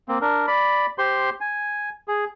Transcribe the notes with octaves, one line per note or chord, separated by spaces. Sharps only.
A#3 C4
D4 A#4
D5 B5
G4 C5 C6
G#5
G#4